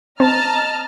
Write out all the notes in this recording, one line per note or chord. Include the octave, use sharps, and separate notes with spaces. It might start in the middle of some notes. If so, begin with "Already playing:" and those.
C4 D#5 A5 A#5 F6